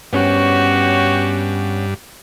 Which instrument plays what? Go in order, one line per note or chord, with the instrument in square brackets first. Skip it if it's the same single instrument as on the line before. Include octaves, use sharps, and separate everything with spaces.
[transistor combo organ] G2 [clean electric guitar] B3 C#4 [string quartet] F#4 G4 C#5